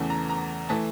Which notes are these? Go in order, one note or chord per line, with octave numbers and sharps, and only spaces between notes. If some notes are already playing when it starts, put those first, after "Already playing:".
Already playing: E2 C#3 E3 A3
A#5
A#5
E3 A3 A5